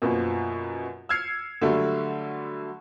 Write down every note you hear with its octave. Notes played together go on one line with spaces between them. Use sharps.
F#2 B2 F3 A#3
E6 F6 G#6 C7 C#7
D3 F#3 G3 A3